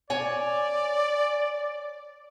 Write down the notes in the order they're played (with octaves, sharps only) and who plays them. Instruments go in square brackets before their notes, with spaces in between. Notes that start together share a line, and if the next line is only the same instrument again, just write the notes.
[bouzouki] C#5 G#5 [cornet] D5